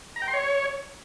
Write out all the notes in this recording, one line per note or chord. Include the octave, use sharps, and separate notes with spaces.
A#5
G5
C6
C#5